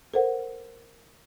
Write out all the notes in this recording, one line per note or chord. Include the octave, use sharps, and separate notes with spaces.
A4 A#4 C5 F#5